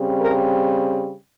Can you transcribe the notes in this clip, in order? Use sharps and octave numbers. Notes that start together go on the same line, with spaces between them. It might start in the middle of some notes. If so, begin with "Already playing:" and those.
Already playing: C#3 G3 C4
A#4